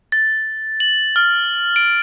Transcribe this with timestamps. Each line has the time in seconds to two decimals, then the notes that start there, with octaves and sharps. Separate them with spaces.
0.12 A6
0.80 F#7
1.16 F6
1.76 D7